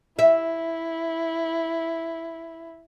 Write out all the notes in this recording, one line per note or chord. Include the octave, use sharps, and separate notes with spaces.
E4 E5